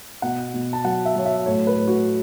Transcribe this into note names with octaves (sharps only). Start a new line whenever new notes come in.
B2 F#5
B2
A5
F#3 F#5
E5
F#3 C#5
E5
A2 C#5
B4
A2
F#4